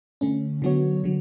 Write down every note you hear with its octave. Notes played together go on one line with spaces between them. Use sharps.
D3 A3 C#4
D3 F#3 B3 F#4 C#5
D3 F#3